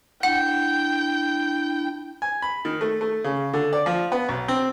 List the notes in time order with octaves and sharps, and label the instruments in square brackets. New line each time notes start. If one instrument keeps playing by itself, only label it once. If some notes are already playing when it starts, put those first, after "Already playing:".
[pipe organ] D4 E4 [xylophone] F#5 [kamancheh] G5
[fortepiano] G#5
B5
D#3
A3
A3
C#3
D3
D5
F3
B3
B1
C4